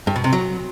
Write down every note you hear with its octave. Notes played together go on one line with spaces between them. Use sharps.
G2
B2
C3
F#3